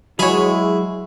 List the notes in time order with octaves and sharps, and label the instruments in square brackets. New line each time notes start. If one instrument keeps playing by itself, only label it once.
[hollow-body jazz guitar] F#3 F#4 [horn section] G#3 E4 [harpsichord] G#4 [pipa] B4 C#5